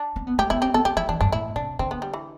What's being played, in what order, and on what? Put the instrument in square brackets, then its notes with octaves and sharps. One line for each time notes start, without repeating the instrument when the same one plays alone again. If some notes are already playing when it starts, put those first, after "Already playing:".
Already playing: [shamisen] D4
[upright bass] C4
B3
[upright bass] A3 [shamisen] G4
[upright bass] B3 [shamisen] E4
[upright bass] C4 [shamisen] G4
[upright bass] B3 [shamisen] A4
[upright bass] B3 [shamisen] G4
[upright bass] F3 [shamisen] E4
[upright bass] E3 [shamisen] D4
[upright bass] G2 [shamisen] D4
[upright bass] A2 [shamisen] E4
[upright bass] C3 [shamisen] D4
[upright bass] D3 [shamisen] C4
[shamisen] B3
G3
E3